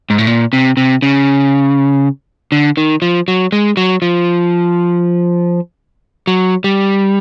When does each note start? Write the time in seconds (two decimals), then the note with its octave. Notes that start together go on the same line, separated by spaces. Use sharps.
0.10 G#2
0.18 A2
0.27 A#2
0.53 C3
0.77 C3
1.02 C#3
2.52 D3
2.77 D#3
3.02 F3
3.28 F#3
3.52 G#3
3.77 F#3
4.02 F3
6.27 F#3
6.64 G3